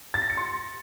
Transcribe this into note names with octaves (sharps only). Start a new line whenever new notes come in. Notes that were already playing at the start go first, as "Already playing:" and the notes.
A6
A#6
C#7
C6